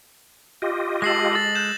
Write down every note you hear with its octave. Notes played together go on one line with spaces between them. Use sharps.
F4 G4 D#5
G#3 A4 A#6 C7 F#7
A6 F#7
F#6 G6 E7